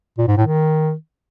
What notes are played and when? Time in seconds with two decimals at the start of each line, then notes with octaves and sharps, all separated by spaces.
0.18 A#2
0.28 G#2
0.37 A2
0.46 D#3